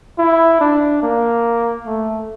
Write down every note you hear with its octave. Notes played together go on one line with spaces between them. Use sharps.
E4
D4
A#3
A3